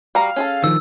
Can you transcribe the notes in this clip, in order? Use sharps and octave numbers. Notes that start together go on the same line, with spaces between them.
G3 F#4 F5 A#5
C#4 G#4 A4
D#3 F3 E6